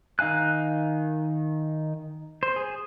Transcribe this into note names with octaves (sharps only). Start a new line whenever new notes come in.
D#3 D#4 F5 G#5 F#6
C5
G#4